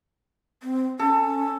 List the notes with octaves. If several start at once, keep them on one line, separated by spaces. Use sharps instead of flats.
C4
C#4 A4